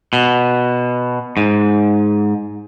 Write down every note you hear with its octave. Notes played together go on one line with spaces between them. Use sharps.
B2
G#2